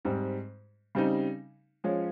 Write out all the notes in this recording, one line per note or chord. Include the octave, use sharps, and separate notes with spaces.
G#2 G3 C4
C#3 G3 C4 D#4
F3 G#3 C#4